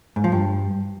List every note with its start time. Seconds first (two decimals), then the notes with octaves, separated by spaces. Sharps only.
0.16 G#2
0.24 F3
0.32 G2